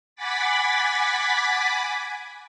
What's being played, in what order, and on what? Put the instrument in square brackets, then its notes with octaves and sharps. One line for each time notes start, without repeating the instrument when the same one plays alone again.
[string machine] F#5 G#5 B5 D6 A6 B6